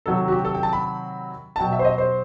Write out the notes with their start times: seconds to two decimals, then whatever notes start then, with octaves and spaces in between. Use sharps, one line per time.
0.06 C3 D#3 F#3 A4
0.28 F#4
0.32 G4
0.45 A4
0.55 G5
0.63 A5
0.73 B5
1.56 A5
1.59 B2 F#3 G5
1.73 E5
1.79 C5
1.85 D#5
1.98 C5